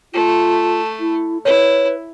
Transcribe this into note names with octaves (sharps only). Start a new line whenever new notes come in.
A3 F4
E4
E4 B4 C#5